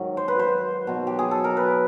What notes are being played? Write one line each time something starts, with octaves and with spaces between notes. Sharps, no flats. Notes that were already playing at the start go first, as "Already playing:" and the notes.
Already playing: G#2 D#3 F#3
C5
B4
C5
B2 F#3
G4
G#4
A4
A#4
B4